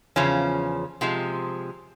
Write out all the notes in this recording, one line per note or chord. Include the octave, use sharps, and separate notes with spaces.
E2 C#3 F3 C#4
C3 F3 G#3